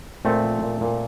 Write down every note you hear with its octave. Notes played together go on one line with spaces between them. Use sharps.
A#2 A3 C4
F3
A#2
A#2